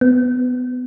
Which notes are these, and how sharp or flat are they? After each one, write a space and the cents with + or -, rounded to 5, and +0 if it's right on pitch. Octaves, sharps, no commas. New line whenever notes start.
B3 +20